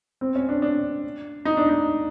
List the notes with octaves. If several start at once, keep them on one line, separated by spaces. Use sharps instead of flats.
C4
C#4
D4
D4
D#4
D4
D#4